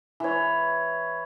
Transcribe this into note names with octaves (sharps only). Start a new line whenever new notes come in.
E3 C#5